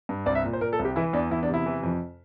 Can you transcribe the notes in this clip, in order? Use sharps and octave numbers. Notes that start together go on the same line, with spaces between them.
G2
C2 D5
E5
A#2
C5
A#2 A#4
A4
C2
G4
E3 E4
E2 D4
E2 E4
D4
C3 E4
E3
F2